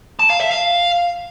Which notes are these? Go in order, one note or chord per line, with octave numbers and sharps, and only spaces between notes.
A5
F5
E5
F5